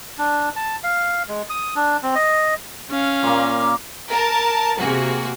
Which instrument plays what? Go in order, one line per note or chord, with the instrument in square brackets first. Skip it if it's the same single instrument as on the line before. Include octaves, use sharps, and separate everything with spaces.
[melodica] D4
A5
F5
G#3
D#6
D4
C4
D#5
[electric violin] C#4 F5
[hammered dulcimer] A#2 A#3
[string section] A#4 A5
C3 A#3 F#4 G#4